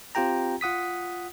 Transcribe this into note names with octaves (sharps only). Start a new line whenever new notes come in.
C4 F4 G4 G5 A#5
F4 F#5 D#6 B6